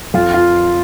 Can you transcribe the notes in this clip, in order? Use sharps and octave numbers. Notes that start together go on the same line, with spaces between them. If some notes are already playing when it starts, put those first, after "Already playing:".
F2 F4
F4